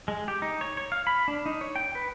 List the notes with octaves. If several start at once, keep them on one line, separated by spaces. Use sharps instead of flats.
G#3
G4
D#4
C#5
C#5
F5
B5
D4
D#4
C#5
G5
B4